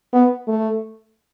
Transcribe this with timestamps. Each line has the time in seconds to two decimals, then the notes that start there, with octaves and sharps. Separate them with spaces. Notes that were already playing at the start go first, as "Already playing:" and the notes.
0.13 B3
0.48 A3